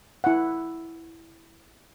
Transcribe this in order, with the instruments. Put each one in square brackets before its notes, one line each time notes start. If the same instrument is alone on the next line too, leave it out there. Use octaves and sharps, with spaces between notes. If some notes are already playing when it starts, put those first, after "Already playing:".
[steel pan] E4 F#5